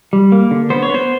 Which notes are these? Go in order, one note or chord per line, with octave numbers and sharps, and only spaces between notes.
G3
A#3
D3
B3 C5
C#5
B3
C5